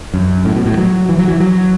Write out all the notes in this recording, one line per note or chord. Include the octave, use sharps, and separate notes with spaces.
F#2
A2
B2
A2
F#3
E3
F#3
E3
F#3